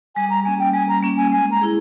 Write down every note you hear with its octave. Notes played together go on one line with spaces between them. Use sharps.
G3 G#5
A#5
A#3 C#4 G#5
G5
G3 G#5
A#5
A#3 C#4
G#5
G#3 G#5
A#5
E4 G#4